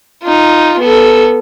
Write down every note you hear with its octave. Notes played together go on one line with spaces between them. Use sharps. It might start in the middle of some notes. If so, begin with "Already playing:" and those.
D#4 F4
B3 A4